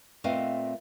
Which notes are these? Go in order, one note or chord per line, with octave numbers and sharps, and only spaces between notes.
A#2 A3 C4 B4 D#5 F5